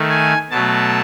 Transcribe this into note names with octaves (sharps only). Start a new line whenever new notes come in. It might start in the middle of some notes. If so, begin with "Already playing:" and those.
Already playing: D#3 A3
G#5
B2 F#3 A3 A5